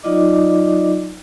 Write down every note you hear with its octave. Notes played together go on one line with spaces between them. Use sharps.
F#3 D#4 F4 D5 D#5 D6